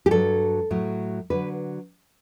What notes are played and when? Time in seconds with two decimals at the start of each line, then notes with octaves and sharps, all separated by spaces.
0.06 G4
0.11 G2 F#3 A4
0.70 A2 F#3
1.30 D3 F#3 B4